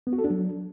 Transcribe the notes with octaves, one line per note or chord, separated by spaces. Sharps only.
B3
F#4
A4
D4
F#3